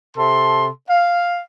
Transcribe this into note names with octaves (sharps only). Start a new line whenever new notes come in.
C3 A4 A5 C6
F5